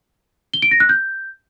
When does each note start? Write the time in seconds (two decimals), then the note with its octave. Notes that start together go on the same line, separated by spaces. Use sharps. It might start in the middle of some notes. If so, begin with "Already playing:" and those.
0.54 G7
0.62 D7
0.71 A#6
0.80 F#6
0.89 G6